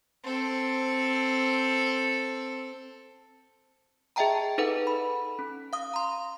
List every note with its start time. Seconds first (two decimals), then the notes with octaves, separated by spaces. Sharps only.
0.23 C4 A4
4.16 G#4 D#5 E5 G5 A5 A#5
4.58 D#4 A4 B4 F#5
4.87 B5
5.39 C#4
5.73 F5 D#6
5.94 A#5 C6